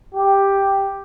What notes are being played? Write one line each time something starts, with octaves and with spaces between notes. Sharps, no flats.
G4